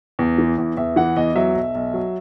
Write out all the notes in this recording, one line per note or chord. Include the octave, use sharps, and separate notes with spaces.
E2
E3
E2
E2 E5
E3 F#5
E2 D#5
F#3 E5
B1
B1
F#3